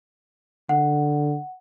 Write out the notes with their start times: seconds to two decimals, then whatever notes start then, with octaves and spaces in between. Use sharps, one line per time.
0.69 D3 F#5